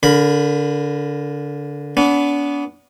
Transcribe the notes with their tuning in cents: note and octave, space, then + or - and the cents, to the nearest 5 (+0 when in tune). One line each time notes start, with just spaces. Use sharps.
D3 -25 A#4 +0 B5 +0
B3 +0 D4 -40